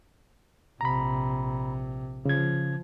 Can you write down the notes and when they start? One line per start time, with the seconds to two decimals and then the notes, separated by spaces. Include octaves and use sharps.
0.81 A#1 C3 A#5 B5
2.25 C#3 F3 G#6